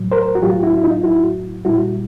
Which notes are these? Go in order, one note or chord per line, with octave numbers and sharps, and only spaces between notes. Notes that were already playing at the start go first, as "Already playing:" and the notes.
Already playing: A2 F#3
A#4 C5
F#4
A2 F#3 F4 G4
E4 F#4
E4
D#4 F4
A2 F#3 E4 F#4
A#2 G3 E4 F#4